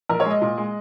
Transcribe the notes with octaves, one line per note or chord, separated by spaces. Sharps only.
A#1 A#4
G#3 C#5
D#5
A#2
G#3